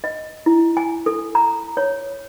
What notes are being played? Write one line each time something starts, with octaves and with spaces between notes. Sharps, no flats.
D#5
E4
G#5
A4
A#5
C#5